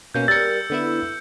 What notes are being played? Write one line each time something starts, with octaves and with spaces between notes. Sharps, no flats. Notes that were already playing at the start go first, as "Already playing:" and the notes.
B2 A#3 C#4 G6
G3 A#4 E6 A6 C#7
D3 B3 E4